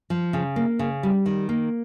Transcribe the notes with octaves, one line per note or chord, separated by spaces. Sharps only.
F3
C#3
A#3
C#3
G3
D#3
A#3